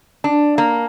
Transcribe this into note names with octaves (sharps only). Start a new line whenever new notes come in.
D4
A#3